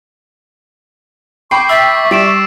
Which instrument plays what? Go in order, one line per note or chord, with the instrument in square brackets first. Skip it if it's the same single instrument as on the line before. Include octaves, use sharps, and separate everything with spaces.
[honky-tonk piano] G5 B5 [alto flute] C#6 [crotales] D6 C7
[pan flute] E5 [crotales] E6 A6 B6
[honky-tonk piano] G3 [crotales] B6 D7 E7